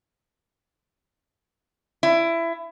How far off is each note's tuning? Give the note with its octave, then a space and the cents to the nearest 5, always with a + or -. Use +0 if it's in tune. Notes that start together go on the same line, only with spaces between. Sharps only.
E4 +20